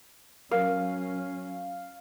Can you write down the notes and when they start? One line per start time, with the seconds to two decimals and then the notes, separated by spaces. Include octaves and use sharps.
0.52 F#3 C#4 A#4 F5